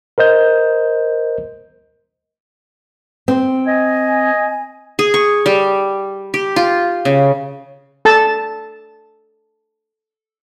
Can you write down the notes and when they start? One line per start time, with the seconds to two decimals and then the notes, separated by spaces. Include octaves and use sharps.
0.18 A#4 C5 D#5 G6
3.28 C4
3.67 D#5 G#5
4.99 G#4
5.14 C#6
5.46 G3
6.34 G4
6.56 F4
7.05 C#3
8.05 A4 A5